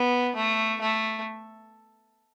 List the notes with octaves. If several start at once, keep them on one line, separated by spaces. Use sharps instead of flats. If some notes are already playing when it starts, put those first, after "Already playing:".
Already playing: B3
A3
A3